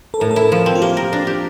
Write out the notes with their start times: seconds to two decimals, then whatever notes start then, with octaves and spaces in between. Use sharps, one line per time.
0.14 A4
0.20 A2 A#4
0.31 A4
0.35 E4 A#4
0.52 F3
0.66 C4
0.75 F4
0.82 A#3 G4
0.97 A#4
1.13 D4
1.27 G4